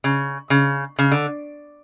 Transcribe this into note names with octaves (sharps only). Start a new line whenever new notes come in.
C#3
C#3
C#3
D3